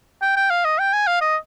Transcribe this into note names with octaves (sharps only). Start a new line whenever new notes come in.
G5
G5
F5
D#5
G5
G#5
F5
D#5